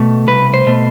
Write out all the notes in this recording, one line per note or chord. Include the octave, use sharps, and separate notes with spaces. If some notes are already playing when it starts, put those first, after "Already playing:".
Already playing: B2 A3
C2 B4
C5
B2 A3